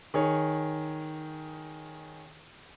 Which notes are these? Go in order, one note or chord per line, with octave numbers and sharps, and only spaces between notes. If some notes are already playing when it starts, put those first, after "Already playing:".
D#3 G#4 C#5